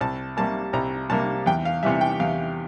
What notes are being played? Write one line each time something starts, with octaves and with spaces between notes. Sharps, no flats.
C2 A5
C3 G3 A#3 A5
C2 A#5
C3 G3 A#3 A5
E2 G5
F5
C3 E3 G3 E5
G5
E2 F5